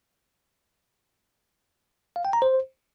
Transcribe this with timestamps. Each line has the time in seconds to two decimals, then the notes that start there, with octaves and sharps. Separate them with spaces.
2.16 F5
2.25 G5
2.33 A#5
2.42 C5